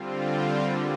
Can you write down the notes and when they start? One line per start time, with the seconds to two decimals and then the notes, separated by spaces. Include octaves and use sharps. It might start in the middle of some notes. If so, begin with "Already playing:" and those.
Already playing: D3 G3 C4 F4
0.63 D3 G3 A#3